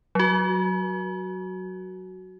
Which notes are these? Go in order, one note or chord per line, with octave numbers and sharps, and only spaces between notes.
F#3 F#4